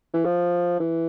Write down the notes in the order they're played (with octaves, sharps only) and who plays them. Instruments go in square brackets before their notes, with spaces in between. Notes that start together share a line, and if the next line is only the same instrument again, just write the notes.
[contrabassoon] E3
F3
E3